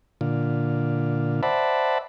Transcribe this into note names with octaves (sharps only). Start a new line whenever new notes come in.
A#2 D3 F4
C5 D5 E5 F#5 A5 B5